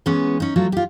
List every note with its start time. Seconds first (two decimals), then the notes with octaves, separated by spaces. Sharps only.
0.06 E3 G#3 B3 C#4
0.40 C#4 D#4
0.56 F#3 A3 F4
0.72 F4 G4